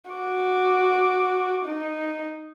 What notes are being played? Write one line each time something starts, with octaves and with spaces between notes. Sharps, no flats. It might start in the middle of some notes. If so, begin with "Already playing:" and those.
F#4 D6
D#4